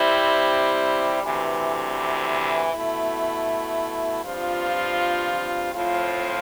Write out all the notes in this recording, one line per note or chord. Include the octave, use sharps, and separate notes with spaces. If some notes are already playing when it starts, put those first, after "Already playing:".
Already playing: C3 G3 C4 E4
D2 C3 E3
B2 A3 E4
G2 F3 C4 F4
A2 F3 C4 F4